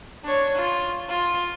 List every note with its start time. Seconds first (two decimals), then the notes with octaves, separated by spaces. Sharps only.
0.24 D4 C#5
0.55 F4
1.09 F4